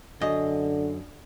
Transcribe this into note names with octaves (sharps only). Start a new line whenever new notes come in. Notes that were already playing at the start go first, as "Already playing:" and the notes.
F#2 D3 D#5